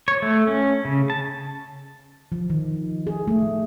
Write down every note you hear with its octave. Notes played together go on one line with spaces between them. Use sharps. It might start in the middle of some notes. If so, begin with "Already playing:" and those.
C#5
A3
C#4
C#3
A5
F3
D#3
G#4
A3